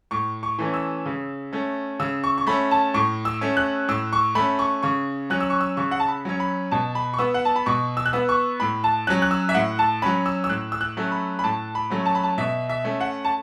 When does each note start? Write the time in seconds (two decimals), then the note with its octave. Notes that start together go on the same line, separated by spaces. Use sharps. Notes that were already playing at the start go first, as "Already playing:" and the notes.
0.11 A2 C#6
0.43 C#6
0.59 E3 A3 C#4
0.74 E6
1.06 C#3
1.53 A3 C#4
2.00 C#3 E6
2.24 C#6
2.38 C#6
2.47 A3 C#4 B5
2.71 A5
2.94 A2 C#6
3.25 E6
3.41 A3 C#4
3.57 F#6
3.88 A2 E6
4.13 C#6
4.35 A3 C#4 B5
4.59 C#6
4.83 C#3 C#6
5.30 F#3 C#4 F#6
5.40 E6
5.50 C#6
5.61 E6
5.77 C#3 C#6
5.91 F#5
6.00 A5
6.08 B5
6.25 F#3 C#4
6.40 B5
6.71 B2 A5
6.95 B5
7.14 C#6
7.19 B3 E6
7.34 F#5
7.45 A5
7.56 B5
7.66 B2 C#6
7.97 E6
8.06 F#6
8.13 B3 E6
8.29 C#6
8.60 A2 B5
8.84 A5
9.07 F#3 C#4 F#6
9.22 F#6
9.31 E6
9.49 E5
9.54 A2 F#5
9.79 A5
10.02 F#3 C#4 B5
10.26 E6
10.44 E6
10.49 A2 F#6
10.72 E6
10.81 F#6
10.97 F#3 A3 C#4
11.12 B5
11.39 B5
11.44 A2 A5
11.75 B5
11.90 F#3 A3 C#4
12.06 A5
12.15 B5
12.23 A5
12.38 B2 E5
12.69 E5
12.84 A3 C#4
13.00 F#5
13.25 A5